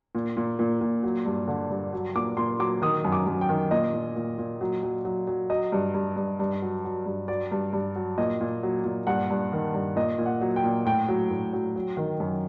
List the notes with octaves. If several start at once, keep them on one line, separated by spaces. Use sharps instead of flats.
A#2
A#2
A#2
A#2
F#3
G2
D3
G2
F#3
A#2 D6
A#2 C6
F#3 D6
D#3 D#6
F#2
D6
F#2
G5
D#3
A#2 D#5
A#2
A#2
A#2
F#3
F#3
F#3
F#3
F#3 D#5
G2
G2
G2
G2
F#3
F#3
G2
F#3 D5
G2
G2
F#3
A#2 D#5
A#2
F#3
A#2
G2 F#5
G2
D#3
G2
A#2 D#5
A#2
F#5
F#3
G5
A#2
A2 G5
F#3
A2
F#3
F#3
D#3
F#2